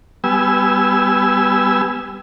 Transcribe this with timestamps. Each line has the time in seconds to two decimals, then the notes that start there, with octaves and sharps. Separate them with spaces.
0.24 G3 B3 G#5 E6